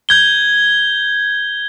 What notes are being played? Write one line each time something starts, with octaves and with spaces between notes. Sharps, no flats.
G6 G#6 G7